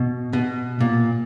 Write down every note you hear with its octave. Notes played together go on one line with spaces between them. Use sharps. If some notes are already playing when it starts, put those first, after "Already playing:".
Already playing: B2
B2
A#2